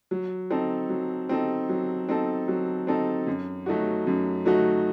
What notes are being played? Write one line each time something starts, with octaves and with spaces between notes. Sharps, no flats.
F#3
C4 D#4 A4
F#3
C4 D#4 A4
F#3
C4 D#4 A4
F#3
C4 D#4 A4
F#2
F#3 A3 D#4 F#4
F#2
F#3 A3 D#4 F#4